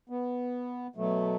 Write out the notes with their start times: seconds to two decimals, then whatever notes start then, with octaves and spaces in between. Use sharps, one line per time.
0.09 B3
0.96 B2 F#3 A3